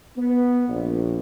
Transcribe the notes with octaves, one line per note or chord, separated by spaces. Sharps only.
B3
A#1